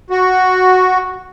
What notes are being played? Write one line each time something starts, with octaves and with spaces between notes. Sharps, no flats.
F#4